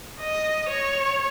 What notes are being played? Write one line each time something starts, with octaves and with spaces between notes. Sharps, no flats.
D#5
C#5